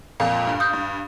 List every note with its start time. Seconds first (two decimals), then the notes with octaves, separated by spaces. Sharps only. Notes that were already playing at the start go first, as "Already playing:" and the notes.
0.20 F2 A#2 F5
0.47 G2
0.60 D#6 G6
0.73 G2